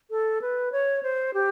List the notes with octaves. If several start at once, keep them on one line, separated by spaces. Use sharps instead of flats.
A4
B4
C#5
C5
G4